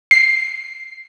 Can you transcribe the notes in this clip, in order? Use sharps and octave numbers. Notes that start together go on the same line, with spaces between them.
C7